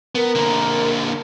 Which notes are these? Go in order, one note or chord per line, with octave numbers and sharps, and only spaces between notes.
B3 A#4
D3 A#3